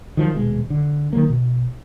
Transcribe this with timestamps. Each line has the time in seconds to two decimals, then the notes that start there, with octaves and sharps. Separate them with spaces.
0.17 D#3 F3 F#3
0.35 D#1 B2 G#3
0.70 D3
1.13 D#3 E3 F#3 A#3
1.30 B2